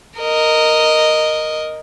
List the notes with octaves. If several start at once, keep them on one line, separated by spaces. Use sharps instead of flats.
A#4 D#5